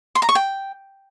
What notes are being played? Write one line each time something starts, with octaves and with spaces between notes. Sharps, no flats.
C6
A#5
C#6
G5